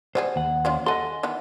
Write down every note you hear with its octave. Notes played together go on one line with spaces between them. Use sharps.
G3 B3 G#4 C5
D#2 F#5
C#4 F4 C5
A4 D#5 F#5 G#5 C6
D#3 E3 B3